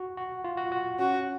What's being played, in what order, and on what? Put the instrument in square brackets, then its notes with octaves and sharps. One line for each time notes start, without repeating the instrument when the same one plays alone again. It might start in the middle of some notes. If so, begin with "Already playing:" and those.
Already playing: [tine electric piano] F#4
F#4
F4
F#4
F#4
[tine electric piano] C#4 [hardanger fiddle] F#4